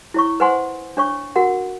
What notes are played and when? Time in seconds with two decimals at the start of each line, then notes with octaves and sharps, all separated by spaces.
0.14 E4 C#5 C#6
0.40 B4 C5 F#5 G#5 C6
0.97 D4 C#5 C#6
1.36 F#4 A#4 F#5